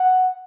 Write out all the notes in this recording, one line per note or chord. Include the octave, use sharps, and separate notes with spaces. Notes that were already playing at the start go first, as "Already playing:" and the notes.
Already playing: F#5